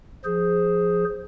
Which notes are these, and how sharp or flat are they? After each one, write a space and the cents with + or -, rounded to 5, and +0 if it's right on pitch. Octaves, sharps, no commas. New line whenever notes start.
F3 +0 G#4 +0 C5 +0